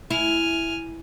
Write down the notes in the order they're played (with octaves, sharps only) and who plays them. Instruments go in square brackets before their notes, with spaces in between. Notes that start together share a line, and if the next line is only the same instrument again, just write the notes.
[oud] E4 [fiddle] G#5 F6